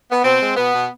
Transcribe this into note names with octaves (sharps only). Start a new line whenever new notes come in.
B3
B2 C4
G#3
B2 B3
B2